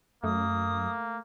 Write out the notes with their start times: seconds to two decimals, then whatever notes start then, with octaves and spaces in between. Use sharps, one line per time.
0.24 F#2 A3 A#3 D#6